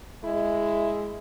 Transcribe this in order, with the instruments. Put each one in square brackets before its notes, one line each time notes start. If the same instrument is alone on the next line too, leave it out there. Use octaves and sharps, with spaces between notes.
[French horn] G#3 [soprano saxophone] E4